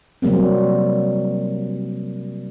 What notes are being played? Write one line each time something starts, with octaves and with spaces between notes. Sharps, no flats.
C3 F#3 G3 A#3 C4